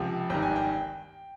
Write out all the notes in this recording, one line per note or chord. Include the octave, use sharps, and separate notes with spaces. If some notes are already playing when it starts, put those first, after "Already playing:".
Already playing: C#2 C3 F3 G#5
G#1 G2 D#3 G5
G#5
G5